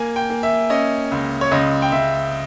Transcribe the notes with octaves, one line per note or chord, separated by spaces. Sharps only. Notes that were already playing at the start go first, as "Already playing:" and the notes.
Already playing: A#3 G#5
G5
A#3
E5
C#4 D#5
C#2
C#5
C#2 D#5
G5
C#2 E5